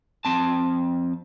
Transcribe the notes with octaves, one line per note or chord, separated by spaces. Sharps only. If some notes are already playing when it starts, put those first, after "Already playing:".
F2 C4 A5